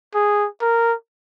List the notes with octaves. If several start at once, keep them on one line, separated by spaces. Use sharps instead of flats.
G#4
A#4